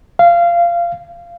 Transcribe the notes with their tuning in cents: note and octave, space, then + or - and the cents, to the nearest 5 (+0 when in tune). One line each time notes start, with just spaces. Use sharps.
F5 -20